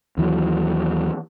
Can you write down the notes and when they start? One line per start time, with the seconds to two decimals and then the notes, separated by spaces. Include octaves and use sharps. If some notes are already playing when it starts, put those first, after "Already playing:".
0.18 D#2 E3 F#3